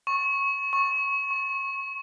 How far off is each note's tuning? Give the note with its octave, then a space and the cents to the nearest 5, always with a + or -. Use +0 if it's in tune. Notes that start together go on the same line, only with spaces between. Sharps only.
C#6 -15
C#6 -15
C#6 -30